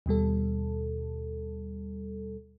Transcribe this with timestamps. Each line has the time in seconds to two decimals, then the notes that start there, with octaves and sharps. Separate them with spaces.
0.06 D#2 B2 G3 A4